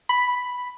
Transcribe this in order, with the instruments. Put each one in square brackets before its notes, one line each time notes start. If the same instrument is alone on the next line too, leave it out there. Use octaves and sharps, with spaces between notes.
[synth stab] B5